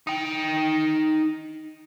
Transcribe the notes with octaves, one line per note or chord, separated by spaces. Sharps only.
D#4 G5